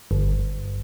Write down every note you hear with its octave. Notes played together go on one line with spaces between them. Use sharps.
G1